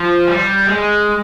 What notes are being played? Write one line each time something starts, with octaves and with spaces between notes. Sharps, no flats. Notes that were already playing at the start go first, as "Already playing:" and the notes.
Already playing: F3
G3
G#3